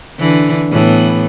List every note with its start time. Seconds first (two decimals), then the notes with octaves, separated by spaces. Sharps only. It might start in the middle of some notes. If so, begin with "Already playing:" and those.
0.20 D3 E3
0.72 A2 E3 B3